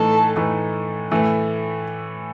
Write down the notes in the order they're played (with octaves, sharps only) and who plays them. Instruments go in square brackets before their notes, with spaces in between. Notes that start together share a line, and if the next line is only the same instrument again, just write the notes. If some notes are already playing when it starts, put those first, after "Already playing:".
Already playing: [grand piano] A2 E3 A3 D#4 [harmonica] A4
[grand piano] A2 E3 A3 D#4
A2 E3 A3 E4